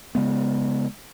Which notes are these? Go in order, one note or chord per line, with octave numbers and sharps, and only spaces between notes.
C#3 G#3 B3